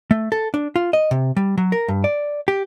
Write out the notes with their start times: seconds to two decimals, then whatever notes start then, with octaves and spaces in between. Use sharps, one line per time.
0.11 A3
0.32 A4
0.54 D4
0.76 F4
0.93 D#5
1.11 C3
1.37 G3
1.58 F#3
1.72 A#4
1.88 G2
2.04 D5
2.48 G4